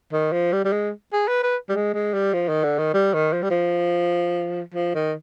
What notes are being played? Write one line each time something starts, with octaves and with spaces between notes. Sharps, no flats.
D#3
F3
G3
G3
G#3
G#4
B4
B4
G3
G#3
G#3
G3
F3
D#3
D3
D#3
G3
D#3
F3
G3
F3
F3
D#3